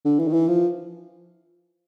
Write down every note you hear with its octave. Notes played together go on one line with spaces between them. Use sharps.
D3
E3
D#3
E3
F3